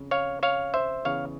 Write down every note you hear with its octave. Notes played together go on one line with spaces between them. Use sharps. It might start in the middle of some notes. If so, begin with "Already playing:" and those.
Already playing: F2 C#3
C#5 F5
C#5 F5
C5 E5
E2 C#3 E3 C#5 F5